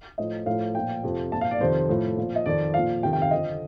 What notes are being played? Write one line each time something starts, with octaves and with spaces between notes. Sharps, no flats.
A2 F3 D#5
A2 F3 F5
A#2 F3 G5
F2 C3 F3
A#2 F3 A5
F5
D5
F2 C3 D#3 C5
A2 F3
A#2 F3
D#5
F2 D#3 D5
A#2 F3 F5
F2 C3 D#3 G5
G5
F5
F2 D3 F3 D#5